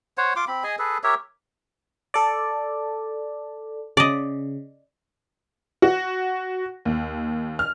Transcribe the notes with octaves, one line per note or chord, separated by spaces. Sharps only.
C5 C#5 F#5
F4 C6 D6
C4 B5
G#4 D#5 G#5
G#4 A4 B4
G4 A#4 C#5 E5
A4 D5
C#3 D5 D#5
F#4
D#2
F6